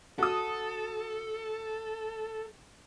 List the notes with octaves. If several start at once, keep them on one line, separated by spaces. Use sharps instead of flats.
F#4 A4 D#6